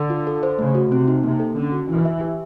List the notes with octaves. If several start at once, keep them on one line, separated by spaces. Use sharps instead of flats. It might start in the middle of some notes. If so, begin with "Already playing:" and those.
Already playing: D3
F4
A4
C5
C#3 A3
F#4
C3 C4
D#4
C3 A#3
A4
D3 C#4
F#4
E3 E4
E5
G4